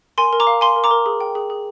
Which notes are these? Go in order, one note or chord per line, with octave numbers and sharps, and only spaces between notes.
A#4 G#5 C6
A#4
A#5 D6
F5
F5 G#5 C6
A#4
A#5 D6
A#4
G#4
G5
G#4
G#4